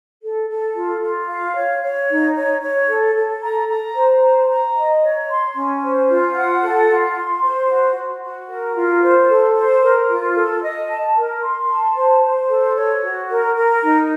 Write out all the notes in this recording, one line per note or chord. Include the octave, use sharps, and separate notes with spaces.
A4
A4
F4
F4
F5
C#5
C#5
D#4
C#5
C#5
A4
A4
A#5
A#5
C5
A#5
A#5
D#5
C#5
C6
C#4
C5
F4
F#5
A4
F4
C6
C5
F#4
F#4
F#4
A#4
F4
C5
A4
C5
A#4
F4
A4
D#5
A5
A#4
C6
A5
C5
C5
A4
C#5
F#4
A#4
A#4
D#4